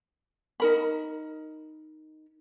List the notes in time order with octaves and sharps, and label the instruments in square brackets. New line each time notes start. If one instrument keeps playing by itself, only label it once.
[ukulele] D#4 A#4 B5